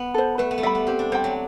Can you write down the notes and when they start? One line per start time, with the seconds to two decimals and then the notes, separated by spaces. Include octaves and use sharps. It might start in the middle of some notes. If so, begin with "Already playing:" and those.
Already playing: B3
0.14 A4 C5
0.38 A3 B4
0.51 B3
0.58 A3
0.63 G3 E5 B5
0.75 B3
0.87 C4 G4
0.99 D4
1.12 G3 C5 G5
1.24 F#3